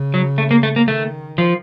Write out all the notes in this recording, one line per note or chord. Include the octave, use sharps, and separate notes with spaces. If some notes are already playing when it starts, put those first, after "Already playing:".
Already playing: C#3
F#3
A3
A#3
A3
A#3
D#3 A3
F3